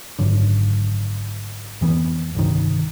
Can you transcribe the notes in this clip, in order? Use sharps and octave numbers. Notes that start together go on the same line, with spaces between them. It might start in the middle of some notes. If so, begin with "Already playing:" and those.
G#1 F#2 D3
F2 E3 A#3 B3
G1 C2 D#3